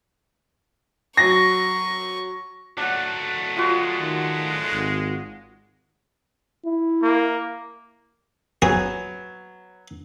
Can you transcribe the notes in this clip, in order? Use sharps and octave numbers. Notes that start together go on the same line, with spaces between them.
F#3 C#6 A#6
F#3 A3 D4 F#5
G#3 F4 F#4
D#3
G#1
E4
A#3
F#3 B3 G#4 D#6